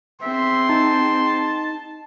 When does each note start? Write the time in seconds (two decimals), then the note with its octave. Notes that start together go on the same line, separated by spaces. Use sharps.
0.22 C4 G#4 E5 C6
0.69 D#4 A5